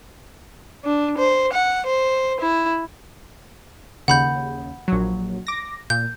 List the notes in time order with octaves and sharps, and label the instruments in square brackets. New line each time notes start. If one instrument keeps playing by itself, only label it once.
[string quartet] D4
C5
F#5
C5
E4
[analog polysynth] D#2 C#3 [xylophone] F#5 B5 G6
[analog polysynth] A#1 F#3
D6 A#6
[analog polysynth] A#2 [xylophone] G6